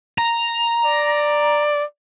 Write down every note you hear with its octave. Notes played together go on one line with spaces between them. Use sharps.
A#5
D5